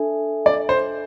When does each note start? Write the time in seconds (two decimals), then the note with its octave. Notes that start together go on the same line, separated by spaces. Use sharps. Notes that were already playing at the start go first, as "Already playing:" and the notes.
Already playing: D4 A4 E5 G#5
0.46 D5
0.69 C5